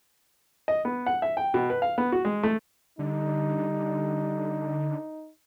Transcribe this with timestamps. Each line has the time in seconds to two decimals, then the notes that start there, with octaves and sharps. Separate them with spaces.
0.68 D#5
0.85 B3
1.06 F#5
1.22 E5
1.37 G5
1.54 B2
1.70 B4
1.82 F5
1.98 B3
2.12 F#4
2.25 G#3
2.43 A3
2.99 D3 G3 D#4